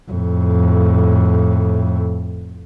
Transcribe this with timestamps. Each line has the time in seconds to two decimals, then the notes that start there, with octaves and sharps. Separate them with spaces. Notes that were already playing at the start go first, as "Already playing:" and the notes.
0.11 F2 A2